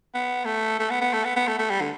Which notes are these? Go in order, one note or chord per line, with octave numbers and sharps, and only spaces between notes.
B3
A3
A3
B3
B3
A3
B3
B3
A3
A3
G3
D3